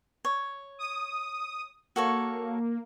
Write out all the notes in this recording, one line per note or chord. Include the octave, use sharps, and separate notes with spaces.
C#5
D#6
A#3 F#4 A4 C#5